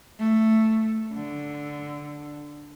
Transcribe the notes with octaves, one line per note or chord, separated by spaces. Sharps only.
A3
D3